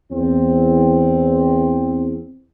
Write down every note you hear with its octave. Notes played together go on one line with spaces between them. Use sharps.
E2 C4